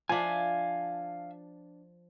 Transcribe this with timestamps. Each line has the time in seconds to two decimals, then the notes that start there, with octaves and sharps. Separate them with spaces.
0.09 F3 D4 E5 F5 G#5